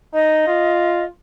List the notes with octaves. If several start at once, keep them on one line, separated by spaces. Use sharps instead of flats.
D#4 D#5
F4